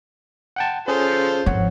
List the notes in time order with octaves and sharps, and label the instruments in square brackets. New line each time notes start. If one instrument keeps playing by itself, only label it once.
[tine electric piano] F#5 G5 A5
[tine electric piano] C#4 G#4 [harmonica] F4 A4 C5
[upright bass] G#1 F3 [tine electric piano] C#5 F#5